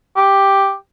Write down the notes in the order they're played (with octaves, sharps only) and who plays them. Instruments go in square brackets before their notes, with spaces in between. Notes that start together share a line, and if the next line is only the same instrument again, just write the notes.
[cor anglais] G4